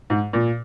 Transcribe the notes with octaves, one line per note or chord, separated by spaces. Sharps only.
G#2
A#2